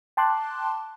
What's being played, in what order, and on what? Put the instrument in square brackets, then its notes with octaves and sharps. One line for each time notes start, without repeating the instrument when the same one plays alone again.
[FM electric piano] G5 A5 C6 D6 F#6